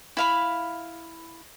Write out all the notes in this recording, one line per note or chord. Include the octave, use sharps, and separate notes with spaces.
E4 F5 B5